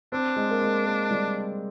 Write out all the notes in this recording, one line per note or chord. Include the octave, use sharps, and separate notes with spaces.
C4 D4
G#3
A#3
G#3
A#3
G3